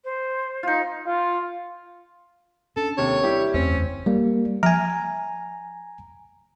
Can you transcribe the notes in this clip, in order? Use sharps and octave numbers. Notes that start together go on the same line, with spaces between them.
C5
D#4 F4
F4
C#4 D4 A4
D#2 C3 C#5
G3 E4 G4
F#1 E2 A3 C4 C#4
G3 A#3
F3 G#5 A#5